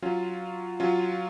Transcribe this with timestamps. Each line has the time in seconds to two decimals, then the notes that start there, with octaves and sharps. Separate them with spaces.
0.02 F#3 C#4 F4
0.80 F#3 C#4 F4